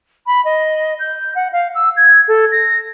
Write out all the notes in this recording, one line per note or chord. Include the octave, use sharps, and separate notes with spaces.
B5
D#5
G6
F#5
F5
E6
G#6
A4
A#6